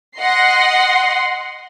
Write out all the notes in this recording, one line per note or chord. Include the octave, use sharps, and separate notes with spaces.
D#5 F#5 C6 C7